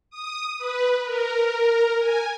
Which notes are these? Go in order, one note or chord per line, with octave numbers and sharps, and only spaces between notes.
D#6
B4
A#4
G#5